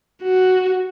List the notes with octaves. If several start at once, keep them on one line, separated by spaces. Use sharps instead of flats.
F#4